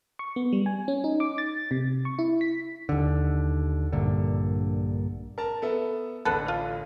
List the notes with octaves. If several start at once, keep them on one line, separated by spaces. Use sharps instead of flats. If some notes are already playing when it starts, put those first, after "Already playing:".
C#6
B3
G3
G#5
C#4
D#4
D6
A6
C3
C#6
E4
B6
D#2 D3
A#1 G2 A#2 D3
A#4 A5
B3 A4 E5
A1 D2 A4 B4 F#5
F4